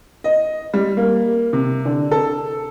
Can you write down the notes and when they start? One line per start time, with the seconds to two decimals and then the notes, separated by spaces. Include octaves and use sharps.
0.24 D#5
0.74 G3
0.97 A#3
1.53 C3
1.85 D3
2.12 A4